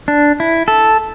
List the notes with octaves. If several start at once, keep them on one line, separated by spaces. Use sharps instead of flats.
D4
E4
A4